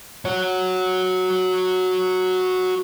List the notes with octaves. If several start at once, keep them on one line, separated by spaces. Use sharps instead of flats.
F#4 C#5